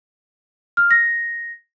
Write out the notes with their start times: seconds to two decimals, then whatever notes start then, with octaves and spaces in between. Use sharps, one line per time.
0.77 F6
0.91 A#6